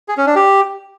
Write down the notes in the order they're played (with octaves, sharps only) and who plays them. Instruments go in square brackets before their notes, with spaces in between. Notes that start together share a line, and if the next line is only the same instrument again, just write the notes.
[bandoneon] G#4
C#4
D4
G4